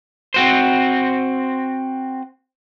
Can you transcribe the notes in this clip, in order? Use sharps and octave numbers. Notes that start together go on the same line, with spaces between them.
C4 F#4 C5